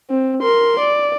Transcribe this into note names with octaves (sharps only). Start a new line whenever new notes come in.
C4
A#4 C6
D5